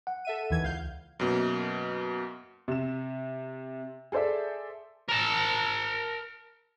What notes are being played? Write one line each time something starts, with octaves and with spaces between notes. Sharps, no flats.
F#5
A4 E5 D#7
D#2 E3 G#6
C#2 F5 G6
F#2 B2 A#3
C3 E7
G#4 A4 C5 D5 E5
A#4 A5